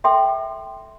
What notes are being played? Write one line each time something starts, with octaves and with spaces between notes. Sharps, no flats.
A4 E5 G5 C6